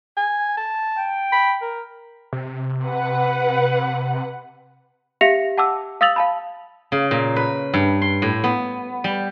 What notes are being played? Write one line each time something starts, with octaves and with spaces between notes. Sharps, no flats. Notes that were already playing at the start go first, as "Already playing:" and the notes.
G#5
A5
G5
B5
A#4
C3
B4 F#5
G4 E5 F5 A#6 C#7 F7
F#5 A5 D6 E6
F5 D#6 E6 A6 F7 F#7
F5 A5 B5
C#3
A#2
B4
G2
C6
A2
B3
G3